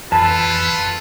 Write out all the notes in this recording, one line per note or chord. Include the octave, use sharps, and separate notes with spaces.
F2 E3 F4 A4 B4 A5